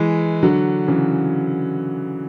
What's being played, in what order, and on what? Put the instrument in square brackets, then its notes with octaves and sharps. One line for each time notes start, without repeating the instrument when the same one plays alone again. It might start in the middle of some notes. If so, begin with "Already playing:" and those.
Already playing: [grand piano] E3 G#3
D3 F#3
C#3 E3